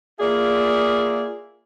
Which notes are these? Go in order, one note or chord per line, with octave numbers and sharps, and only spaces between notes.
A#3 F4 G#4 D5 E5